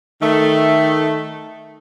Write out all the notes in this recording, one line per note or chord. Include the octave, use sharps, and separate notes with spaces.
D#3 A3